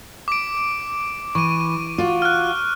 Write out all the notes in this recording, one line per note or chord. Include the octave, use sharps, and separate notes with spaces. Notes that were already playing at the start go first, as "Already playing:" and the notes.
D6 D7
E3 C#6 D#7
F4 F#4
F6 F#6